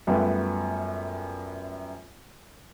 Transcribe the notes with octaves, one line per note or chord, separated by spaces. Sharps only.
F#2 G3 A3 B3 F4